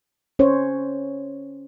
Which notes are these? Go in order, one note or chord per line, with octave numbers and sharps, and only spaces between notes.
C#4 C5 C#5